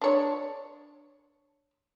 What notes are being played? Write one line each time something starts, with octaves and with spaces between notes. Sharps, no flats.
D4 C#5